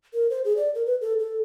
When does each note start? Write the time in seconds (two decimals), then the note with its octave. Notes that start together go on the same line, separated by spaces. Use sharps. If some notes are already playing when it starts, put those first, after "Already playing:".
0.14 A#4
0.30 C5
0.45 G#4
0.56 D5
0.75 A#4
0.86 B4
1.01 A4
1.19 A4